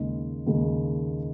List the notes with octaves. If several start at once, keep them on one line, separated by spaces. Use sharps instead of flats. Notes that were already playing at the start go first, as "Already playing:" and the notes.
Already playing: D#2 C#3 G#3 D#4
D#2 C#3 G#3 D#4